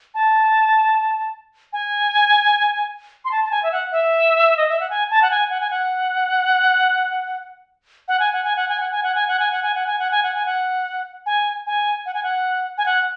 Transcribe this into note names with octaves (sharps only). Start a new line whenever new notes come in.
A5
G#5
C6
A5
A5
G#5
E5
F#5
E5
D#5
E5
F#5
G#5
A5
F#5
G#5
F#5
G#5
F#5
F#5
G#5
F#5
G#5
F#5
G#5
F#5
G#5
F#5
G#5
F#5
G#5
F#5
G#5
F#5
G#5
F#5
G#5
F#5
G#5
F#5
G#5
G#5
F#5
G#5
F#5
G#5
F#5